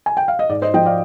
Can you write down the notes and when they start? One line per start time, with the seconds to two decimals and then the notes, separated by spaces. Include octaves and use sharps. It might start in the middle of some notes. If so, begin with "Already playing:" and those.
0.06 G#5
0.17 G5
0.28 F5
0.39 D#5
0.49 G#2 D5
0.62 C5 D#5
0.74 F3 D#5 G5
0.86 D5 F5